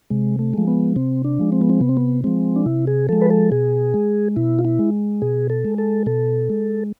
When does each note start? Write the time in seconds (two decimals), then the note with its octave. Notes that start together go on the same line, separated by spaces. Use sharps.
0.10 C3 G#3
0.39 A3
0.54 F3 G#3
0.67 B3
0.96 C3 C4
1.24 D4
1.39 F3 G#3
1.52 C4
1.61 B3
1.70 C4
1.81 C3 B3
1.89 C4
1.97 B3
2.24 F3 G#3 C4
2.56 D4
2.66 C3 E4
2.87 G#4
3.09 F3 G#3 A4
3.22 B4
3.30 A4
3.52 B2 G#4
3.94 G#3
4.36 B2 E4
4.59 F4
4.65 E4
4.79 G#3
5.22 B2 G#4
5.50 A4
5.65 G#3
5.78 A4
6.06 B2 A4
6.50 G#3